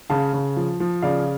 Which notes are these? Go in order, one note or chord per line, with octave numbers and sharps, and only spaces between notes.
C#3 F5 A5
C#3
F3
F3
C#3 D5 F5